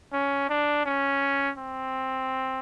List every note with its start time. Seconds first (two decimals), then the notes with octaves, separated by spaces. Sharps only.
0.13 C#4
0.49 D4
0.86 C#4
1.58 C4